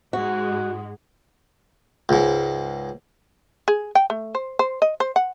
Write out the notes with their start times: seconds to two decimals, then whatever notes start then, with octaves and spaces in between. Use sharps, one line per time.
0.13 G#2 G#3 F#4
2.09 C#2 G#2
3.68 G#4
3.95 G5
4.10 A3
4.35 C5
4.59 C5
4.82 D#5
5.00 C5
5.16 F#5